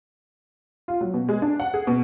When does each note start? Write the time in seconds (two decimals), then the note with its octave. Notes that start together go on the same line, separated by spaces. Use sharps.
0.88 F4
1.01 F#3
1.14 B2
1.29 G#3
1.42 D4
1.60 F#5
1.74 G#4
1.87 B2